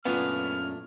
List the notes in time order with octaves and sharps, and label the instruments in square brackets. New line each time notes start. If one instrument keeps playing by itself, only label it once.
[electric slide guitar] F#2 C#4 F5 [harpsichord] A#2 A3 D4 [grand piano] B3 [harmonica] F6